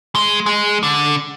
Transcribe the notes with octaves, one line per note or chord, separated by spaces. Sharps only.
G#3
G#3
D3